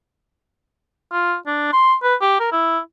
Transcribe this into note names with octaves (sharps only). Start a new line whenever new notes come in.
F4
D4
C6
B4
G4
A#4
E4